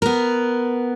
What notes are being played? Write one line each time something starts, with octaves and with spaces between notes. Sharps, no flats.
B3 A#4